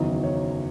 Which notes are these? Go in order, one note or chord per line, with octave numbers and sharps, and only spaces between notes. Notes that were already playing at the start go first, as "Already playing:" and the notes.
Already playing: F#1 E2 D#3 F#3 D#5
C#5